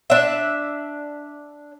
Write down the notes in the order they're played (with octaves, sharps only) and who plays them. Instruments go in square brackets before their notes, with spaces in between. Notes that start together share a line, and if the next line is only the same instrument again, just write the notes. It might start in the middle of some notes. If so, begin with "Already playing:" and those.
[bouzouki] D4 E5